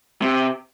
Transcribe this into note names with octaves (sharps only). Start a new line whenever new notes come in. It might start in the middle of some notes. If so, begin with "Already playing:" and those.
C3